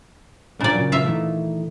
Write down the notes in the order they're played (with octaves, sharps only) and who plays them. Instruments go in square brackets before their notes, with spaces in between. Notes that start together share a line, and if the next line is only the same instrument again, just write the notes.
[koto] A#2 D5 [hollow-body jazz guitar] D4 A#4
[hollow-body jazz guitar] C#3 F#3
[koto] E5 F5
[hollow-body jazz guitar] D#3 E3 A3